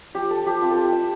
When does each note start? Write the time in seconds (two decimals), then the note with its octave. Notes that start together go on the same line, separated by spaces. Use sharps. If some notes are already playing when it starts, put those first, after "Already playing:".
0.15 F3 G4
0.30 A4
0.38 F3
0.47 G4
0.62 C4 F4
0.71 A4
0.78 G4
0.85 E4
0.92 E5